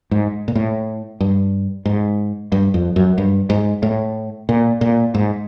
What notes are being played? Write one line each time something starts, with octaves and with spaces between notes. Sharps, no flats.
G#2
A#2
A2
G2
G#2
G2
F2
F#2
G2
G#2
A2
A#2
A#2
G#2